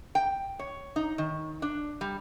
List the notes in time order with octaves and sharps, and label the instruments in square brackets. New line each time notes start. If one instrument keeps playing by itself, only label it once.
[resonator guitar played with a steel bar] G5
C#5
D#4
D#3
D4
G3